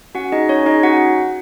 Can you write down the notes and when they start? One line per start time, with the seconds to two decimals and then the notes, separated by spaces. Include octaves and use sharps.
0.15 C#4 F#4 F#5
0.32 D#4 G#4 D#5
0.49 C#4 C#5
0.66 D#4 G#4 D#5
0.83 C#4 F#4 F#5